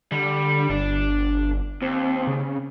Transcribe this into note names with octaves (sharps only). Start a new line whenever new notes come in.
D3 G3
G1 D4
D#2 C4
C#3